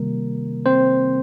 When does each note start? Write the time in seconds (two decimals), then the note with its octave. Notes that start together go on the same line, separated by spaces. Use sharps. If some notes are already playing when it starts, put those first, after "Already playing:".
Already playing: C3 D#3 G3 A#3 A#4
0.66 C4 C5